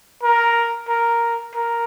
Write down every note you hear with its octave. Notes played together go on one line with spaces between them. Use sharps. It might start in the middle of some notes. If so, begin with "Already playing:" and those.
A#4
A#4
A#4